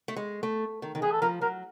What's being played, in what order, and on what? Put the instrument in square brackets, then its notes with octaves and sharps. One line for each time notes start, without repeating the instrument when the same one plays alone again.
[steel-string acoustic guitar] A3
G#3
A3
D#3
D#3
[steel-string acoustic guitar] E3 [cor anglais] G#4
[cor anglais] A4
[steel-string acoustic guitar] F3 [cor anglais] A#4
[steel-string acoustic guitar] F#3 [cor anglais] A#4